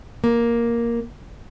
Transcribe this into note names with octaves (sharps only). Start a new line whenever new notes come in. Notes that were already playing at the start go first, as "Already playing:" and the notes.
A#3